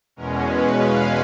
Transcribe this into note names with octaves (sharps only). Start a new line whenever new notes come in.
E2 B2 G#3 C#4 A#4
B4
F5